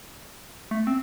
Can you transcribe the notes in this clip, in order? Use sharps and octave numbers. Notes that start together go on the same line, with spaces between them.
A3
C4